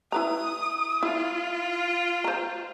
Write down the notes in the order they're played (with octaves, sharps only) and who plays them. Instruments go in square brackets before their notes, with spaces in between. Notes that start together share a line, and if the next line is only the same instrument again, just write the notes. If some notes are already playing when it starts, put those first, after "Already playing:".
[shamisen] E4 B4 A#5 [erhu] D#6
[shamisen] E4 [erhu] F4
[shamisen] C5 A#5